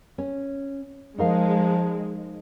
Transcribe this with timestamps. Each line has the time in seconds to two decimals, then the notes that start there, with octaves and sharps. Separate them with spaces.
0.18 C#4
1.18 F3 G#3 D#4 A#4 F5